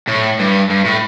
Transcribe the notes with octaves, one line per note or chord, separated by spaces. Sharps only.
A2
G2
G2
A2